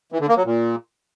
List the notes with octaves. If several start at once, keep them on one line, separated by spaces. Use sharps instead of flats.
E3
D3
A#3
F#3
A#2